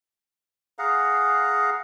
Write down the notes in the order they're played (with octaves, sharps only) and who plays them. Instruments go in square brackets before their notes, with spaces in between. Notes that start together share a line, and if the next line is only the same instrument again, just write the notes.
[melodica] G#4 F5 F#5 A#5